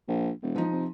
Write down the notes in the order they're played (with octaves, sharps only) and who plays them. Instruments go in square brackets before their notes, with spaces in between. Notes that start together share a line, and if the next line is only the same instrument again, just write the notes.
[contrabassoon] A#1
E1
[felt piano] F3 D#4
[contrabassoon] C3